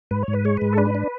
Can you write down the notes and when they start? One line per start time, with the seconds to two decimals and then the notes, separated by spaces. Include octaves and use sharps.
0.11 G#2 B4
0.23 C#5
0.28 G#2
0.33 B4
0.45 G#3 C#5
0.57 G#2 B4
0.73 A4
0.77 D4 B4
0.95 D4